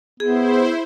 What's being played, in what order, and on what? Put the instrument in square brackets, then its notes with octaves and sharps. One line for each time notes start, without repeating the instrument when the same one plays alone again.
[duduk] B3 [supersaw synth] E4 C5 [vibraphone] G#4